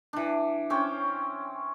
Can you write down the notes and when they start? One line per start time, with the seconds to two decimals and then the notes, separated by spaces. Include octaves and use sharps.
0.13 E3 D4
0.70 C4 C#4 C#5 G5